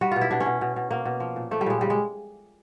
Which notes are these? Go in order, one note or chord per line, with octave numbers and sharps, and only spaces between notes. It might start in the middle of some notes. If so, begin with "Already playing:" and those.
G3 F#4
B2 F4
E4
B2 D4
C#4
B2
B2
B2
B2 A#3
B2
F3
A#2
F3 A3
G3
A#2 G#3
C#3 G3
G#3